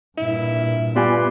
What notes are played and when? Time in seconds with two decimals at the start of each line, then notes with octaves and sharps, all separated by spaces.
0.17 G2 A#2 E4
0.96 G3 B3 F4 B4 D5 G#5 C6